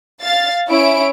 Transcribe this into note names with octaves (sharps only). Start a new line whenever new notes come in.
F5 A6
C#4 E4 C#5 D7